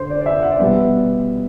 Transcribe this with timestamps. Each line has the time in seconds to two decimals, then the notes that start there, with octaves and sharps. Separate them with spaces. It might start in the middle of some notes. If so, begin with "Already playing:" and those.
Already playing: D3 C5
0.10 D5
0.21 D5
0.26 E5
0.42 F#5
0.52 D5
0.59 B2 G3 B3 E5